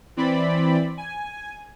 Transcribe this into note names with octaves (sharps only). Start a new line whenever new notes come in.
E3 C4 D5 B5
G#5